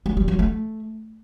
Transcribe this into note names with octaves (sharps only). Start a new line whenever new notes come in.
G#3
G3
F#3
A3